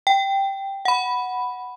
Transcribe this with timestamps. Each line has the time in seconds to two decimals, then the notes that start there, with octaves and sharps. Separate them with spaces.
0.07 G5
0.85 F#5 B5